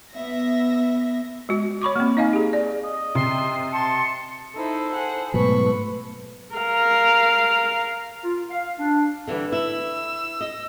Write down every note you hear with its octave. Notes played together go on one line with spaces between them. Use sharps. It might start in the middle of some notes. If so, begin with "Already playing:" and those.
B3 E5 A#6
G#3 F#4
C#5 B5 C#6 D6
A#3 C4
D#4 D#5 F5 G#5
G4 G#4
D5
D#5
C3 C6
A5 C6 C#7
D#4 E4 A4 C5
G#4 F#5
G#2 B2 F#3 A3 B4 B5 C#6
A#4 F5
F4
F5
D4
D3 E3 G3
E4 E6
D#5